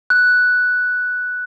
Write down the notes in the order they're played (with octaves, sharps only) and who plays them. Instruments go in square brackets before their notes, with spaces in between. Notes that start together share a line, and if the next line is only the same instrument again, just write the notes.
[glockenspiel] F#6